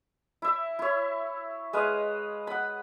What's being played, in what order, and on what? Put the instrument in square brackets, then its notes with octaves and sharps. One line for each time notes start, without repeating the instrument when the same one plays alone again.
[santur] E4 E5
E4 C#5
G#3 B4 D#5 F5
F#5 B5